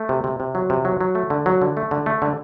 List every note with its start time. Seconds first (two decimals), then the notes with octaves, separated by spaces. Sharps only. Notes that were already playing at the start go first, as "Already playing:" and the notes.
Already playing: A3
0.09 C3
0.24 C3
0.40 C3
0.55 F#3
0.70 C3
0.85 F#3
1.01 F#3
1.15 A3
1.30 D3
1.46 F#3
1.62 D3
1.77 A3
1.91 D3
2.06 A3
2.22 D3